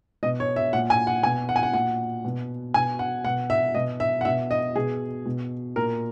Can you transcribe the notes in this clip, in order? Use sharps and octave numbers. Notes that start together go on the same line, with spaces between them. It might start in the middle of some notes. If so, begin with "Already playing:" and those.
B2 D#5
C#5
E5
A#2 F#5
G#5
F#5
B2 G#5
F#5
G#5
F#5
A#2 F#5
B2
B2 G#5
F#5
B2 F#5
E5
B2 D#5
E5
F#5
B2 E5
D#5
B2 G#4
B2
A#2 A#4